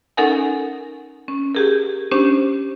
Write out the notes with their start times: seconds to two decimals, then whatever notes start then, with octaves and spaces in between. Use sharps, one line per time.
0.17 C#4 D#4 A4 A#4 F#5 G#5
1.28 C#4
1.55 G4 G#4 A#4
2.11 C#4 D4 G4 C5